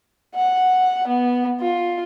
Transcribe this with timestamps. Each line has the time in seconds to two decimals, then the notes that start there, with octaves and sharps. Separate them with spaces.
0.35 F#5
1.08 B3
1.60 F4